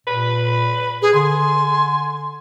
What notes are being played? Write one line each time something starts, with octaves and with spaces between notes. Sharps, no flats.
A#2 B4
G#4 B4
D3 G#5 C6